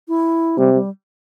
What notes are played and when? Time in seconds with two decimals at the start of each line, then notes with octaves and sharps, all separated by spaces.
0.08 E4
0.58 C3 G3
0.74 G3